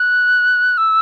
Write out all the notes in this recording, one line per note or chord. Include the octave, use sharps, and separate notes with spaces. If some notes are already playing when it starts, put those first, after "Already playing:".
Already playing: F#6
E6